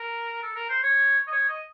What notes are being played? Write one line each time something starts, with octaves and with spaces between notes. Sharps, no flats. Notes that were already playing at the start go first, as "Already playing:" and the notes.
Already playing: A#4
A4
A#4
C5
C#5
D#5
C#5
D#5